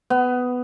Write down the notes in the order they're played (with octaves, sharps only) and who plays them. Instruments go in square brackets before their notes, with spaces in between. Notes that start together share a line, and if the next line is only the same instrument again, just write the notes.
[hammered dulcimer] B3